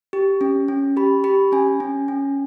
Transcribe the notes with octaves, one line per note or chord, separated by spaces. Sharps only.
G4
C#4
C#4
G4 B5
G4 B5
C#4 G#5
C#4
C#4